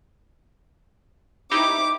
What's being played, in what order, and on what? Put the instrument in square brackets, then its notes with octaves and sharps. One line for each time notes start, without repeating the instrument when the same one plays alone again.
[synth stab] D#4 E4 G4 [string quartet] D6